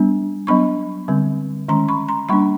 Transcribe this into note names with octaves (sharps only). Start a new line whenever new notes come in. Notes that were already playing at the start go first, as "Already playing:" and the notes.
Already playing: G3 B3 D4
F#3 B3 D4 B5 C#6
D3 G3 C4
D#3 G#3 C#4 A#5 C6
B5 C#6
A#5 C6
G3 A#3 D4 B5 C#6